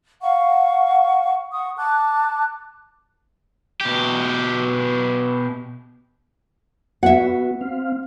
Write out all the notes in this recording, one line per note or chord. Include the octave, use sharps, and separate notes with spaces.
F5 F#5 C#6
F#5 C#6 D#6
A5 D6 F#6
B2 G4
B3 F#4 E5 F#5
C4 F5